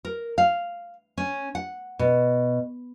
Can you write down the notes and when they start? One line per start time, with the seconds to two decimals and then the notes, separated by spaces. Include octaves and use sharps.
0.05 A#4
0.38 F5
1.17 C#4
1.55 F#5
1.99 B2